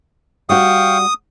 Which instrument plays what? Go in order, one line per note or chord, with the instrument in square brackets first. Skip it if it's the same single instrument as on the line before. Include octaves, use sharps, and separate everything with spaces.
[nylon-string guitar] G3 F#4 [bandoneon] F5 G5 C#6 [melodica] D#6